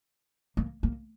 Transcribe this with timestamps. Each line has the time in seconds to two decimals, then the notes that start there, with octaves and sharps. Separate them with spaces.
0.57 A#3
0.83 A#3